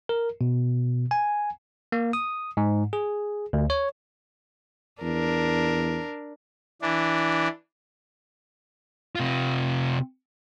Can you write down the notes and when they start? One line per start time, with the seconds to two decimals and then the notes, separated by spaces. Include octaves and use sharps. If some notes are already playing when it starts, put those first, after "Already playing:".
0.09 A#4
0.41 B2
1.11 G#5
1.92 A#3
2.13 D#6
2.57 G#2
2.93 G#4
3.53 D2
3.70 C#5
5.02 E2 D4 A#4
6.82 E3 D4
9.15 C3 F4